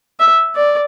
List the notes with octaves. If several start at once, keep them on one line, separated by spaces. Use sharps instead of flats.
E5
D5